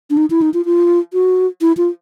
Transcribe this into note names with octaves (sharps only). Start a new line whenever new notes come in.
D4
D#4
E4
D#4
F4
F4
F#4
E4
F4